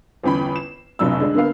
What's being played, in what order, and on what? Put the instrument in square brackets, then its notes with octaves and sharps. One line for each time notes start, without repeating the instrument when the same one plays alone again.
[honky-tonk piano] G1 E2 C#4 G5 B5
E7
F1 B1 F2 F#3 D4 E6
D3 G#3 D4
D3 A#3 B3 F5